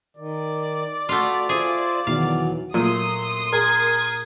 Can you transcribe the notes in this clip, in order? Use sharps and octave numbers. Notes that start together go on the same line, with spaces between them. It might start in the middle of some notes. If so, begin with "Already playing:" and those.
D#3 D5
A3 F4 F#4
F4 G#4 C5 E5
E2 B2 D#3 E3 F#3 F5
A#2 F#3 A3 C6 D#6
G#4 A#4 G#6